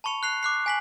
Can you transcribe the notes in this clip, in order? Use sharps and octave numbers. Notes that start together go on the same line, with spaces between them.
A5 B5 C#6 C#7 F7
F#6 C7 F7
D6 F#6 C7
G#5 B6 F#7